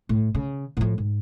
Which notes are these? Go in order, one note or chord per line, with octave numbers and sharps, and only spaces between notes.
A2
C#3
A2 F3
G#2